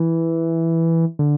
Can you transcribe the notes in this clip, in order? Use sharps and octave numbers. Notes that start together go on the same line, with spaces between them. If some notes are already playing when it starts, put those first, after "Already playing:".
Already playing: E3
D3